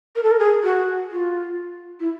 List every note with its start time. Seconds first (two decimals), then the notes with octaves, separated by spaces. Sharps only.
0.16 A#4
0.23 A4
0.31 A#4
0.39 G#4
0.63 F#4
1.12 F4
2.00 E4